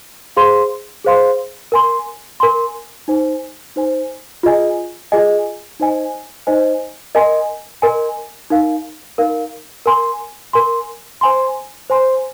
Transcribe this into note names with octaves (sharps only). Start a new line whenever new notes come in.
G#4 C5 F5 C6
G#4 C5 F5 C6
A#4 G#5 C6
A#4 G#5 C6
D#4 C5 G#5
D#4 C5 G#5
F4 G#4 D#5 G#5
F4 G#4 D#5 G#5
D#4 C5 D#5 G#5
D#4 C5 D#5 G#5
A#4 D#5 G#5 C6
A#4 D#5 G#5 C6
D#4 A#4 F5
D#4 A#4 F5
A#4 G#5 C6
A#4 G#5 C6
C5 G#5 C6
C5 G#5 C6